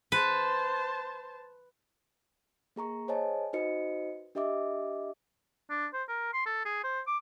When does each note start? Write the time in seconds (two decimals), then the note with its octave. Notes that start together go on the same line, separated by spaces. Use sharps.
0.12 B4 C5 A5
2.76 A#3 G#4 A#5 C#6
3.08 G#4 C5 C#5 D#5 G#5 A5
3.53 D#4 F#4 B4 C5 D#5 C#7
4.35 D4 G4 D#5 E5 D6
5.70 D4
5.93 C5
6.08 A#4
6.33 C6
6.46 A4
6.65 G#4
6.84 C5
7.07 D6